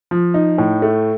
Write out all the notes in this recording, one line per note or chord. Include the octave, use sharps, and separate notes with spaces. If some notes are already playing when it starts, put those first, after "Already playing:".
F3
D#4
A2
A3